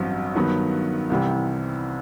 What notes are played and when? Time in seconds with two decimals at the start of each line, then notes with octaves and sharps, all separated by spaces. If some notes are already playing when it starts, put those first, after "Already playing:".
Already playing: A1 G2 F#3 C4
0.36 G2 D#3 F#3 B3
1.10 C2 C3 E3 G3